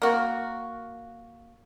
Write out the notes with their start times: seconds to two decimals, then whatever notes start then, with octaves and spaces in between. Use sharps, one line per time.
0.02 A#3 F#4